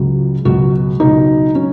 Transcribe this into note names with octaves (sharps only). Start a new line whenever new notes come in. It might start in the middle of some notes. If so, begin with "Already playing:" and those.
Already playing: C#2 C#3 F#3 F4
C#2 B2 F#3 F#4
C#2 B2 F#3 D#4
F#3 C#4